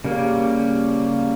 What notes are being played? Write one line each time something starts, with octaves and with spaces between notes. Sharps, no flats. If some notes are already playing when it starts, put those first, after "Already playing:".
C#3 G3 A#3